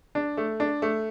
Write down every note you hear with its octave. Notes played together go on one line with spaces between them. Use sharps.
D4
A3
D4
A3